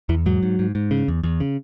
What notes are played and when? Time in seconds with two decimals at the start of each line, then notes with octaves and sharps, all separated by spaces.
0.09 E2 E3
0.26 G#2 F#3
0.43 G#2
0.59 G#2
0.75 G#2
0.91 C#3
1.08 E2
1.23 E2
1.40 C#3